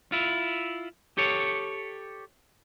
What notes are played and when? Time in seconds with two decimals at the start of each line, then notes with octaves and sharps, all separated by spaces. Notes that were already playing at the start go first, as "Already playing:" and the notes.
0.12 E4 F4
1.17 G4 A4 C#5